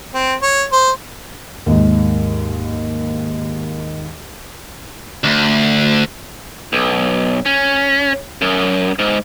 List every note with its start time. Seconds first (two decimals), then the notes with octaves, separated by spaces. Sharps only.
0.14 C4
0.42 C#5
0.72 C5
1.66 D#2 G#2
5.24 D2
6.73 B1
7.46 C#4
8.42 F#2
8.99 G#2